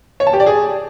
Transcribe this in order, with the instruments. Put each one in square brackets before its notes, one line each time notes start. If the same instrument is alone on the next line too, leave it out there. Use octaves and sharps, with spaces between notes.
[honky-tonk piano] C#5
A5
G4
D5
G#4